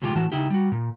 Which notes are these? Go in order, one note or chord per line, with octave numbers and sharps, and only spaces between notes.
A2 C3 F3 G#3 F4 G4
A2 E3 F#4 A5
C#3 D#4 E4 G4
G3 F#4
A#2